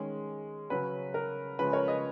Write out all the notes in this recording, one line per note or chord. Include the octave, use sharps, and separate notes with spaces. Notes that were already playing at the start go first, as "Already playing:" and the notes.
Already playing: D#3 G#3 C#4
C#3 F#3 C#4 B4
A#4
C#3 F3 G#3 B4
A#4 C#5
B4 D#5